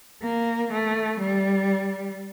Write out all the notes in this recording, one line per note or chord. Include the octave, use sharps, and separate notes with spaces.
A#3
A3
G3